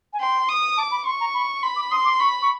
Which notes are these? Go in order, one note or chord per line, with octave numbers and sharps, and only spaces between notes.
G#5
G5 C6
D#6
A5 D6
B5
C6 C#6
A#5
B5
B5 C6
D6
C6 D#6
D6
B5 C#6
C#6